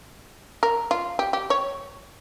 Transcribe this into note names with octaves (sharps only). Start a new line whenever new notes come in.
A#4
F4
G4
G4
C#5